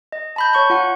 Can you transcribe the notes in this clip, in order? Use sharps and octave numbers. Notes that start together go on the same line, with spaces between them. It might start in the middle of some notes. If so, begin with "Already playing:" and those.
D#5
A5 B5 G6
C#5 C#6 G6
F4 F#5